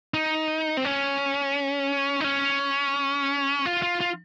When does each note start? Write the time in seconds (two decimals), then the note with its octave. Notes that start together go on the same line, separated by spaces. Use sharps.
0.14 D#4
0.77 C4
0.85 C#4
2.21 D#4
2.24 C#4
3.66 F4
3.82 F4
4.01 F4